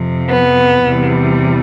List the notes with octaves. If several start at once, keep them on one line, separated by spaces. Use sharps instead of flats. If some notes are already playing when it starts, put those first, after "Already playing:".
Already playing: F2 C3 F3
B3
E2 C3 E3 G3